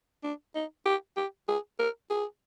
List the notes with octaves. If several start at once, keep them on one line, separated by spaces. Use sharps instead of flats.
D4
D#4
G4
G4
G#4
A#4
G#4